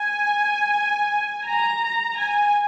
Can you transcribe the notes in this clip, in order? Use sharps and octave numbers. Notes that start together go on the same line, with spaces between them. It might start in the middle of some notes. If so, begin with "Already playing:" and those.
Already playing: G#5
A#5
G#5